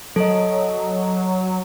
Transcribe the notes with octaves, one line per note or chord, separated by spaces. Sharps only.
F#3 A4 D#5